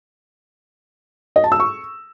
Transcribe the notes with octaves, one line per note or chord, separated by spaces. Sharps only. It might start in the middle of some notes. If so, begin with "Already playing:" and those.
D#5
A5
E6
C#6